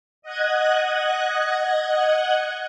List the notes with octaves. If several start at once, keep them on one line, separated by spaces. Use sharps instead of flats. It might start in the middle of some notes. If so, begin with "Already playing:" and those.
D#5 F#5 F#6 G#6